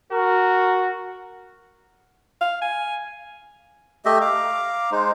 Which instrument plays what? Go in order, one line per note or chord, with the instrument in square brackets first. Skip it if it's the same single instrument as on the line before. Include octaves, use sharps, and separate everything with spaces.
[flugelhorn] F#4 [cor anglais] A#4
[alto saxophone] F5
G#5
[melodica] A3 G4 D#5 E5
F5 A#5 D6
G#3 D#4 C5